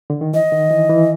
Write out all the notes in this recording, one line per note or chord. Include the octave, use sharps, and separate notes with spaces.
D3
D#3
E3 D#5
D#3
E3
E3